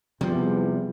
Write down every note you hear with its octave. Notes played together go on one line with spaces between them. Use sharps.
E2 C3 F3 G3